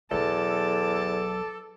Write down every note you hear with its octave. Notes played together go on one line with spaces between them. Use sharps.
B1 E2 F#3 A4 A5 D6